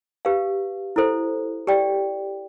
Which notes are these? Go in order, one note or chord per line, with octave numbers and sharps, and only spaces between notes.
G4 B4 F5
E4 A4 C5
G4 D5 G5